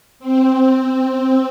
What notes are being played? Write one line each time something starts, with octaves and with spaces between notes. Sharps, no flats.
C4